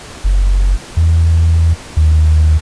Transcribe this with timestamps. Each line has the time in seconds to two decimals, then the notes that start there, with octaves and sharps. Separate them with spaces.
0.24 F#1
0.97 E2
1.97 D#2